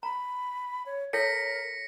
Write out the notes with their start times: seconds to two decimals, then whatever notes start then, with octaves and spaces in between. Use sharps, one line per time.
0.03 A#5 B5
0.86 C#5
1.13 E4 A4 A#4 C#5 A#6 B6 C#7